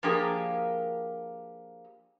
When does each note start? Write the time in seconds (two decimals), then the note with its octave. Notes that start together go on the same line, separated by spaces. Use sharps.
0.03 F3 A#3 D4 G4 G#4 A#4